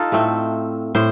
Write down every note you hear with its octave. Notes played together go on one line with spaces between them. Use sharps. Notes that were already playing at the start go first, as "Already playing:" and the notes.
Already playing: D#4 F4 A4
A2 A3 C4
A2 C5